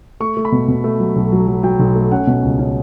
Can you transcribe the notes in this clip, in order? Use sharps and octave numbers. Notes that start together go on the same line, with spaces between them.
A3 C#6
A3
B5
B2
B2
A3
F#3
B1
F#3
F#3
F#3 G5
B1
A3
C#4 F#5
B2
C#2
C#4